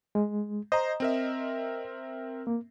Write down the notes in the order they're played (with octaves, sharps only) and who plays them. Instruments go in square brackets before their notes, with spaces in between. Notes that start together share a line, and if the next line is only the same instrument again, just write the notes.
[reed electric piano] G#3
[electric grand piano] C5 A#5 [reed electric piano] D#5
[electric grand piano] C4 A#4 E5
[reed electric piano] A#3